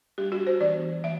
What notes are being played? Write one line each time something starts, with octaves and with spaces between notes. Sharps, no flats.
G3 D4 G4
F#4
C5
E3 B3 D4 D5
E3 A3 E5